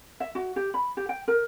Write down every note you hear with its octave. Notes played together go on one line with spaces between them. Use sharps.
E5
F#4
G4
B5
G4
G5
A#4